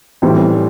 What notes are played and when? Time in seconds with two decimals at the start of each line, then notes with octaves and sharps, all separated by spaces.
0.22 A2 E3 G3 C4